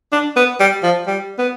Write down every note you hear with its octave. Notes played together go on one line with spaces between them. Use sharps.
D4
B3
G3
F3
G3
B3